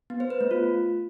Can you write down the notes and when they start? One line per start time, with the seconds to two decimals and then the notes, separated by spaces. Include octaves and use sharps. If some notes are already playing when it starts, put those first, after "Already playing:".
0.10 B3
0.20 C5
0.30 B4
0.41 A3
0.51 F4